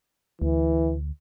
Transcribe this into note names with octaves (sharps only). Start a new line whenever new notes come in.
D2 E3